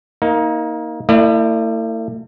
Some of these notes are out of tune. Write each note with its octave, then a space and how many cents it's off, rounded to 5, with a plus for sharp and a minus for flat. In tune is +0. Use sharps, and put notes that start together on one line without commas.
A#3 +0 D#4 +25
A3 +45 E4 +0 D5 +35